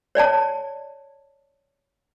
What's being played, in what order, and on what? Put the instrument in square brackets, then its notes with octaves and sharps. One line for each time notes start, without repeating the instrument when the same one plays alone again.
[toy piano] C#5 D5 G#5 A5